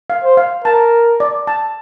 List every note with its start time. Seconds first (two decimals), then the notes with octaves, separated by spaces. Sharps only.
0.10 F5
0.24 C5
0.37 F5
0.65 A#4 A5
1.20 D5
1.47 A5